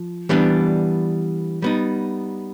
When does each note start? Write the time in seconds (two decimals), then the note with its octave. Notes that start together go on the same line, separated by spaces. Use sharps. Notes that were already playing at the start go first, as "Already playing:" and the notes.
Already playing: F3
0.29 E3 G3 B3 D4
1.62 G3 B3 D#4